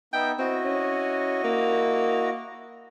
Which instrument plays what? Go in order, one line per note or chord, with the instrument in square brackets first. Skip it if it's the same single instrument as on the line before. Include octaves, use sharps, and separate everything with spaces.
[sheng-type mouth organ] B3 D#4 E5 [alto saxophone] G5
[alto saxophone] C4 [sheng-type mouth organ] E4 F#4 D#5
[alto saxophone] C#4
A#3